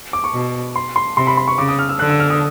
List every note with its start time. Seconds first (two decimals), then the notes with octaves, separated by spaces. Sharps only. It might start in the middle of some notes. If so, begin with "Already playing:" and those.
0.13 D6
0.24 C#6
0.34 B2
0.76 C6
0.96 C6
1.17 C3 C6
1.27 B5
1.37 C6
1.48 C#6
1.58 C#3 D6
1.69 D#6
1.79 F6
1.89 E6
1.99 D3 F#6
2.10 E6
2.20 F6
2.30 D#6